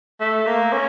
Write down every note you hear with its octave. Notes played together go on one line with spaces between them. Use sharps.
A3
A#3
C#4